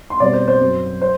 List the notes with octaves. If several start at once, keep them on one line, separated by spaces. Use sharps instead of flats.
C6
B2 G3 C4 D5
C5
C5
F#2 F#3 C4
C5